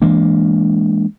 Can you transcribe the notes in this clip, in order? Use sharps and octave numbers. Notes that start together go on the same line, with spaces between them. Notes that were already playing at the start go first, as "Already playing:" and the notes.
E3 G#3 A#3 D4